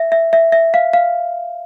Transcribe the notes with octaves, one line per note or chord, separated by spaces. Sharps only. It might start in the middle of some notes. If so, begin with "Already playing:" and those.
Already playing: E5
E5
E5
E5
F5
F5